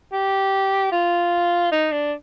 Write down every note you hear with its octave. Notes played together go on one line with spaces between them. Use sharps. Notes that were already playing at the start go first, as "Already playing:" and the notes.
G4
F4
D#4
D4